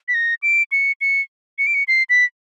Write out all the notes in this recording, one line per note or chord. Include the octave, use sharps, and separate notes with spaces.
B6
A#6
D7
C#7
C#7
C#7
D7
C#7
C7
B6